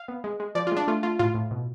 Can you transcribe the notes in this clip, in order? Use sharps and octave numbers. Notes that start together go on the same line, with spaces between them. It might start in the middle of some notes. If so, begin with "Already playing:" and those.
Already playing: F5
B3
G#3
G#3
F3 D5
F4
G#3 D4
A3 F4
A3 F4
A2 F4
A2
B2